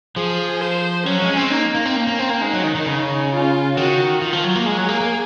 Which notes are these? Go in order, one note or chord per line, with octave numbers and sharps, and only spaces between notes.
F3 G#4
C5
F#3 C#4
G#3
C4
A#3 D#4
A#3
C4
A#3 C#4
A#3
C4
A#3
G#3 D#4
F#3
D#3
D#3
C#3
F4
D#3 F#4
D#3 F4
F3
F#3
A#3
G#3 G#4
F#3
A#3
A#3